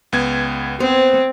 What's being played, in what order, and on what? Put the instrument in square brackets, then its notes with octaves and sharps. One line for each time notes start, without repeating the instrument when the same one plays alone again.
[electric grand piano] C#2 B3 G#6
[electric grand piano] B3 [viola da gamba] C4 [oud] C5